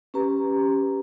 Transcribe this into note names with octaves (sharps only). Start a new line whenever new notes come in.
C#4 G4 B4 A#5